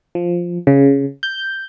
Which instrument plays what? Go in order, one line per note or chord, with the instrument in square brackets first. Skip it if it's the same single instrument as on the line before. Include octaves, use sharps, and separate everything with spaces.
[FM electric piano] F3
C#3
G6